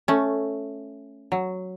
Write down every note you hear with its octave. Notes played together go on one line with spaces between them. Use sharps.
A3 C#4
F#3